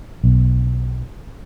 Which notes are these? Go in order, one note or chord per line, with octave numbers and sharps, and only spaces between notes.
B1